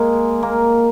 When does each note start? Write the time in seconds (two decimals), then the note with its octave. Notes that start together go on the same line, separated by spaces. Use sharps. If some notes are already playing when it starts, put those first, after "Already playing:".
Already playing: G#3 A#3
0.43 A#3